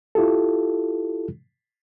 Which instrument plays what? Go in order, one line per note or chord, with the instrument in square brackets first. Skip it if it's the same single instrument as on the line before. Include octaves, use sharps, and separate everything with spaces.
[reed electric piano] E4 F4 G4 A4